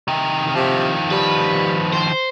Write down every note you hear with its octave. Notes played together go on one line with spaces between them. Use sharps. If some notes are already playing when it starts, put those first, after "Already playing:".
C3 D#3
C3 D#3 F3
G3 B4
C5